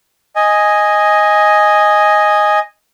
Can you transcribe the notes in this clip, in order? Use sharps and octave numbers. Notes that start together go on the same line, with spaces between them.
D#5 G#5